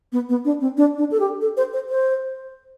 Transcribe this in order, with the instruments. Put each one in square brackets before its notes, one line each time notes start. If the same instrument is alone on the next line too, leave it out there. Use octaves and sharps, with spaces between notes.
[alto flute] B3
B3
D4
C4
D4
D4
A4
G4
A4
C5
C5
C5